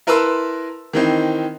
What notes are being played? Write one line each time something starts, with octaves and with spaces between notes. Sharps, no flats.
E4 A#4 B4 A5 C6 E6
D#3 E3 C4 D#4